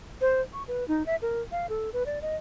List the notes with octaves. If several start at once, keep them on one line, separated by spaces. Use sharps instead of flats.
C5
C#6
B4
D#4
E5
A#4
F5
A4
B4
D5
D#5